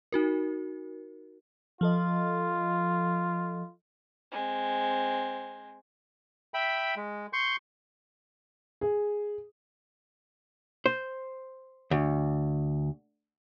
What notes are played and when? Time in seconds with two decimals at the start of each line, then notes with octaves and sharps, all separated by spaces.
0.12 D#4 F#4 A#4
1.81 F3 F4 A4 D#5
4.32 G#3 C4
6.54 E5 G5 B5
6.96 G#3
7.33 C6 C#6 G6
8.81 G#4
10.86 C5
11.91 D2